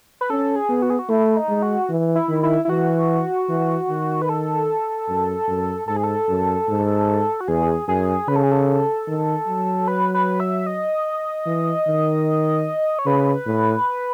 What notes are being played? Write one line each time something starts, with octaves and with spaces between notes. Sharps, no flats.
B4
C#4 A4
G#4
B3
F#4
G#4
F#4
A3 E4
D#4
G#3
F#4
E3
E4
D#3
E4
E4
E3 F#4
E3
D#3
B4
A4
F#2
F#2
G#2 A4
G#4
A4
F#2
G#2
F#4
E2 G#4
F#2 G#4
C#3 B4
A4
G#4
A4
D#3
F#3
B4
B4
E5
D#5
E3
D#3
C#5
C#3 B4
A2